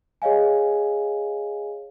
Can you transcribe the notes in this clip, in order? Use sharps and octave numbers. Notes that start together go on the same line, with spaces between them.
G#4 C#5 D#5 F5 G#5